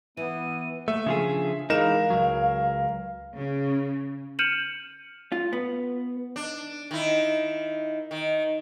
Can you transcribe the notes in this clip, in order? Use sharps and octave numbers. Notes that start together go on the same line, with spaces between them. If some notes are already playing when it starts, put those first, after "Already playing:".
E3 B3 E4 D#7
A3 A#3 E5
C#3 F3 D4 G#4
E3 G#3 D#4 A#4 F5 E7
C#2 F#3
C#3
F6 G6 C#7 D#7 E7 F#7
F4
B3
D4
D#3 E4
D#3